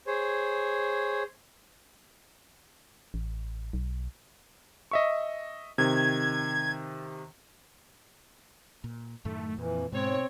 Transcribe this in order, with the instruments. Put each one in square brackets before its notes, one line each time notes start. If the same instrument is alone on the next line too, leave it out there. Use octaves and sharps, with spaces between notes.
[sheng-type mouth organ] G#4 C5 C#5
[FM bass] A1
B1
[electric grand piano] D#5 E5 C#6
[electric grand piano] C3 D#3 [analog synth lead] G#6
[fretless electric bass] A#2
[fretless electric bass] F#2 A2 D#3 [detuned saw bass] A3
[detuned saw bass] F2 [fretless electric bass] A#2 [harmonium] E3
[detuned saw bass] G#2 [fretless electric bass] B2 [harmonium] C4 [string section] C#5